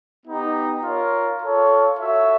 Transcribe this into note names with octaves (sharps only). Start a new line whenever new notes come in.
B3 D#4 G4
F4 A#4 C#5
F4 A4 C#5
F#4 A4 C#5 E5